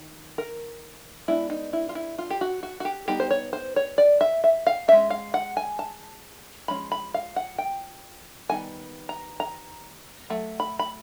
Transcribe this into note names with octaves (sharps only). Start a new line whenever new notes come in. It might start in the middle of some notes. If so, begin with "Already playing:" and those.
Already playing: D#3
A#4
G#3 B3 D4 E4
D#4
E4
F4
E4
F4
G4
F#4
F#4
F#4
G4
G3 B3 D#4 G4
C5
C#5
C5
C#5
D5
E5
E5
F5
G#3 C#4 E5
F5
F#5
G#5
A5
F3 G#3 C#4 B5
B5
F5
F#5
G5
D#3 G3 B3 D#4 G#5
A#5
A#5
F#3 A3
B5
B5